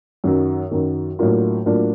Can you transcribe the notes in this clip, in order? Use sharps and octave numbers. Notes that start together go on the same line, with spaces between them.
F#2 D#3 F#3
F#2 D#3 F#3
A2 F#3 A#3 D4 F4
A2 F#3 A#3 D4 F4